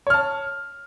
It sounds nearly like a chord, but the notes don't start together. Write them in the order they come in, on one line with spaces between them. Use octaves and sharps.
C#5 F6 A5